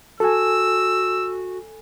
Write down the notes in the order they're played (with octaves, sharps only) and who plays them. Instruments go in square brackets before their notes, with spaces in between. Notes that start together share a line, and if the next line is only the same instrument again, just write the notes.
[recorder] F#4 [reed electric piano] A4 G#5 [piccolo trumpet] E6